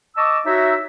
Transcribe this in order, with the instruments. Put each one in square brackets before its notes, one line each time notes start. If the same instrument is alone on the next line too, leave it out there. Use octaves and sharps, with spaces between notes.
[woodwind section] D#5 A5 C#6 D6 E6
D#4 F#4 C#5 E5